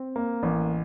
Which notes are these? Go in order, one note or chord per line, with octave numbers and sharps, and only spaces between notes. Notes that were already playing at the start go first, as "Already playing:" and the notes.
Already playing: C4
A#3
A1